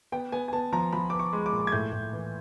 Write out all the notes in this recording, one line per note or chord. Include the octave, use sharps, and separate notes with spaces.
B3 G5
B3 G#5
G#5
B3 A5
F3 A#5
F3 B5
B3 D6
C#6
G#3
D6
A#2
G#6
A2 G6
A2
E3